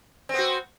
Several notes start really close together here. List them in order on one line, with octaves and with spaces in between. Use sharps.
C4 B3 F#4